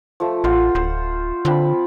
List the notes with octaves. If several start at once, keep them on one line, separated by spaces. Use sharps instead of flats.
F3 A3
A1 F4 C5 F#5
D1 C5
D3 F3 C4 B5